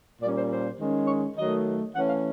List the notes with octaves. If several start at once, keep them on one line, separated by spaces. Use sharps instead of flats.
A#2 G3 A#3 C#4 D5
C5
C5
D#3 G#3 C#4
C#5
D#3 F#3 A3 D#5
E3 A3 C#4 F#5
F5